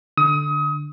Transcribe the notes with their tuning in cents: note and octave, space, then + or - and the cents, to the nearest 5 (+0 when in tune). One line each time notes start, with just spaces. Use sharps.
D3 +0 D#6 +30